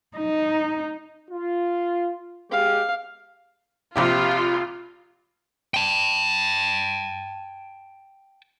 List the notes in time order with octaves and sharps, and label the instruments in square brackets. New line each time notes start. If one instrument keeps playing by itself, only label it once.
[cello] D#4
[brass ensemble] F4
[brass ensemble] G#3 G4 [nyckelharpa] F5
[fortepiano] A#1 C3 G4 [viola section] F4
[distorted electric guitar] G5 A5